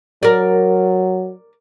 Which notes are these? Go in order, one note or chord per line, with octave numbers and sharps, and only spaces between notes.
F#3 A#4 D5